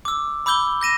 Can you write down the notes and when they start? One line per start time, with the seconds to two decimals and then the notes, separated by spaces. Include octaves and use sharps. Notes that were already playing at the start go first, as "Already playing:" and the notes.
0.05 D6 E6
0.46 B5 D6 E6 G6 G7
0.81 G6 A#6 D#7 E7